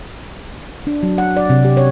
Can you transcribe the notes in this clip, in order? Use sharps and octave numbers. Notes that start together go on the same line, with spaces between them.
D4
F#3
F#5
D5
C3
G4
C#5